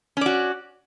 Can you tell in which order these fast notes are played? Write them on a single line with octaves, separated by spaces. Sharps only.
C#4 D5 F#4